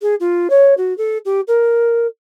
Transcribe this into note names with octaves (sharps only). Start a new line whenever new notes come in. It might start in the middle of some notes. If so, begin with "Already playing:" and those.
G#4
F4
C#5
F#4
A4
G4
A#4